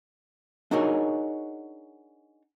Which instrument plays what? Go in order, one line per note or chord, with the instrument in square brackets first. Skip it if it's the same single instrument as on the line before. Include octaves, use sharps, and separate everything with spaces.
[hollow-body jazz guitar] D4 D#4 F#4 G#4 A#4 C#5